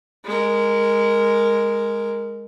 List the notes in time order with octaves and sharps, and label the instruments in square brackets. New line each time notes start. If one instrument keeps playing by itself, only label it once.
[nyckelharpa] G#3 A#4